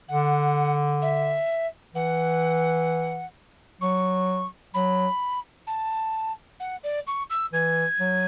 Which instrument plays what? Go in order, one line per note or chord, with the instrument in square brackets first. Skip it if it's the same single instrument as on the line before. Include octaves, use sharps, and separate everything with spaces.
[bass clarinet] D3 [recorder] F#5
[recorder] E5
[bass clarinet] E3 [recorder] F#5
[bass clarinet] F#3 [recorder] C#6
[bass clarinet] F#3 [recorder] B5
[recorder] A5
F#5
D5
C#6
E6
[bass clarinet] E3 [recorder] G#6
[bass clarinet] F#3